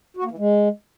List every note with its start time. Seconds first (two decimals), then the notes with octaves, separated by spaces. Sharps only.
0.17 F#4
0.24 A#3
0.31 E3
0.38 G#3